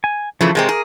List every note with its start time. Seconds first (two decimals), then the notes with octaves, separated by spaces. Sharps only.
0.04 G#5
0.41 C#3 E3 F3 A3
0.55 C3 G#3 C4 A#4
0.69 G#4